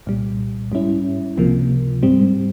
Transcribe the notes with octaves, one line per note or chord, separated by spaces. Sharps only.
C2 A#2 G3
G#2 G3 C#4 E4
C#2 C3 F3 A#3
G#2 G3 C4